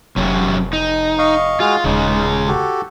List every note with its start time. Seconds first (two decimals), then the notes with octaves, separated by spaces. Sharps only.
0.17 F1 F#2 C3 F#3
0.73 D#4
1.19 D#5 F5 C#6
1.60 G#3 F4 F#4 G#4
1.84 D#1 C#3 G#3 D#4
2.48 F#4 G4 A4